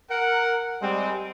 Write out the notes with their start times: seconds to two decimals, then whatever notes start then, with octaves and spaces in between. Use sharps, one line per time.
0.11 A#4 F#5
0.82 G3 G#3 C4